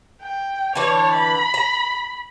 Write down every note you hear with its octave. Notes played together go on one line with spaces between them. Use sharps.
G5
D3 E3 D4 C#5
B5
A#5